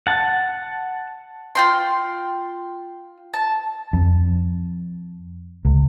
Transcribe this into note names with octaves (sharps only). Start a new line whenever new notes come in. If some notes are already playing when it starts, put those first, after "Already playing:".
F#5 A5
F4 G5 C6
A5
F2
C#2